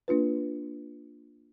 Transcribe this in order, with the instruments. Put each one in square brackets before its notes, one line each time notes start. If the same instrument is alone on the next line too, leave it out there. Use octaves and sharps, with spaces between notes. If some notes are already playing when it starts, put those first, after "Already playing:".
[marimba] A#3 D4 F4 B4